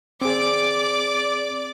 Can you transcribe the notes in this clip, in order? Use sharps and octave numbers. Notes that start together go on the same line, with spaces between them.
C4 G#4 D5 D6